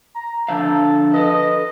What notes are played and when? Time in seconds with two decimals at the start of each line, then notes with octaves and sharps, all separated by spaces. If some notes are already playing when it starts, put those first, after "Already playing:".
0.15 A#5
0.48 D3 F3 A4 F5
1.13 A4 B4 D#5